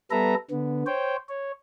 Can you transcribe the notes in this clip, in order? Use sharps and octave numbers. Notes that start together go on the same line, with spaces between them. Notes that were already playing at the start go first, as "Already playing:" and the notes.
G3 B3 A4 B4 E5 A#5
D3 B3
C5 C#5 G5
C#5